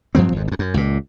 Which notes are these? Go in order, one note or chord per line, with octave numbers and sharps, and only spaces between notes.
G2 F3 F#3 C4
G#1 F2
F2 G#2
F#2
C#2 A#2